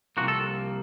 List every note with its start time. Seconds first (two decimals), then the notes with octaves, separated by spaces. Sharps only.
0.17 C2 C3 F3 A#3 F#4
0.28 A4